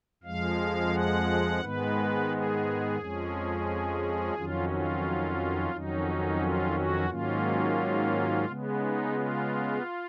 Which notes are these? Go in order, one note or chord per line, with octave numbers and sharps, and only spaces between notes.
F2 F3 G#3 F5
F#5
G#2 D#3 G#3 B3 B4
G#4
F2 F3 G#3 C#4
F2 D#3 F#3 C#4 F4
F4
F2 D#3 F#3 C#4 D#4
F4
F#4
G#2 D#3 F#3 A#3 C#4 F4
C#3 G#3 B3
D#4
F4